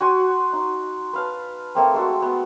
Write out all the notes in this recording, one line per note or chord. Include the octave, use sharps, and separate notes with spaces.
F#4 G#5 C6
D#4
B4 F5 A5
A3 A#3 C4
G#3 A3 F#4
B3